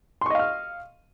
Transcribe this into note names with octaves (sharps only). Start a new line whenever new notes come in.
D#5 F5 C6 C#6 F6